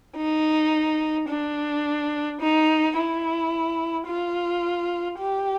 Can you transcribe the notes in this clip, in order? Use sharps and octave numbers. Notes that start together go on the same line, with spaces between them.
D#4
D4
D#4
E4
F4
G4